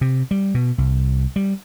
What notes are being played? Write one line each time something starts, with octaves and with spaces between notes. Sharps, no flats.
C3
G3
B2
C2
G3